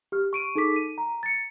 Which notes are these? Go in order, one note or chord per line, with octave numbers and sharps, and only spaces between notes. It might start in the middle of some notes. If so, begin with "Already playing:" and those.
G4 F6
C#6 D7 D#7
D#4 G#4 A4 D6 B6
D#7
A#5
A6 C#7